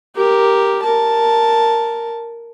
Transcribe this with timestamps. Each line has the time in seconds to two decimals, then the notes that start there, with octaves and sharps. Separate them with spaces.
0.16 G4 A#4
0.82 A#4 A5